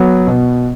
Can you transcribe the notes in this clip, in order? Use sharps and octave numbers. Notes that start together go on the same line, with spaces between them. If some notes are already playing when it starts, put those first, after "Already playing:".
Already playing: F#3 B3
B2